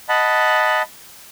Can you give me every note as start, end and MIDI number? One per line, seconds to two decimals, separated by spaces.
0.09 0.82 75
0.09 0.82 78
0.09 0.82 81
0.09 0.82 83